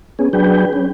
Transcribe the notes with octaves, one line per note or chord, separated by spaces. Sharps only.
B3 C#4 G#4
F#3 D4 G#4 B4 G5
C#4